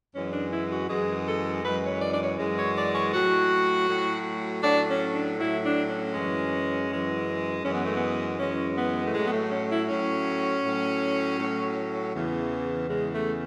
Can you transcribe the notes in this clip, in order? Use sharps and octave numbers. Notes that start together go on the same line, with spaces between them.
F#2 E3 G#3 C#4
D4
E4
F#4
F#2 E3 G#3 G#4
A4
F#2 E3 G#3 B4
C#5
D5
D5
C#5
F#2 E3 G#3
C#5
D5
C#5
A2 F#3 F#4
A2 F#3
A2 F#3 D4
C#4
D4
A2 F#3 E4
D4
C#4
F#2 E3 G#3
F#2 E3 G#3
F#2 E3 G#3 C#4
B3
A3
B3
F#2 E3 G#3 C#4
B3
A3
A2 F#3 G#3
B3
A3
C#4
E4
A2 F#3 C#4
A2 F#3
A2 F#3
E2 C#3 E3
E2 C#3 E3 G#3
A3